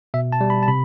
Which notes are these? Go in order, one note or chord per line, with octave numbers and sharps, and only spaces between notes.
B2 E5
A5
G3
B5
A5
C3 B5